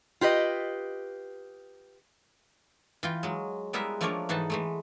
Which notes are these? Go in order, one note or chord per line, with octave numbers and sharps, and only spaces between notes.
F4 G4 B4 D#5
E3 F4 G5
F#3 G#3
G3 G#3 B3 E4 A#4 E5
F3 A3 A#3 D4 A#4 C#5
G#2 E3 D#4 F#5 A5
E3 G#3 A3